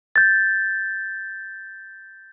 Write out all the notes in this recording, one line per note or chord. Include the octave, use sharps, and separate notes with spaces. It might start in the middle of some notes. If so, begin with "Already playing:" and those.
G6 A6